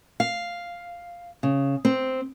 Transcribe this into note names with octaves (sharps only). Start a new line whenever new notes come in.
F5
C#3
C4